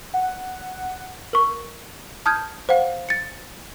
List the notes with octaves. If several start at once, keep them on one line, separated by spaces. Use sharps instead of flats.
F#5
A#4 C#6
A5 D#6 F6 G6 G#6
C5 F5 F#5
A6 C#7